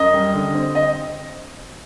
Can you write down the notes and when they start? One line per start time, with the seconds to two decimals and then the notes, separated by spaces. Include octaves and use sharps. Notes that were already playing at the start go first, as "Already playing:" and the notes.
Already playing: F#2 D#5
0.14 G3
0.34 D3
0.55 C4
0.75 D#5